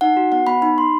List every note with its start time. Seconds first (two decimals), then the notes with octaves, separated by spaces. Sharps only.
0.01 D#4 F#5
0.17 F#4
0.32 B3 F#5
0.47 B3 B5
0.62 D#4 B5
0.78 D#4 C6